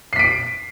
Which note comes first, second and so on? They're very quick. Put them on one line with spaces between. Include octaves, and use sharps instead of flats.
C7 B6 D7